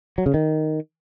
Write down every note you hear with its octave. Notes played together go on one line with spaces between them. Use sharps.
F#3
C#3
D#3